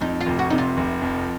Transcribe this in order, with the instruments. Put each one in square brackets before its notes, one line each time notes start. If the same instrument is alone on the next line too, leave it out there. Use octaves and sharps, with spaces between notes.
[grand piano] F2 [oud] D#4
[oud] F4
[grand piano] F1
[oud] F#4
[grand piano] C3 [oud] D#4
[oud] F4
[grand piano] F1
F2